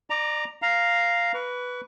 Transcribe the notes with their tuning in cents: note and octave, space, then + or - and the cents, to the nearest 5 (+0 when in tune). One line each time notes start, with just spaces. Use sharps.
D5 +35 A#5 +0 D6 +0
F5 +0 A#5 +0
B4 +0 C#6 +40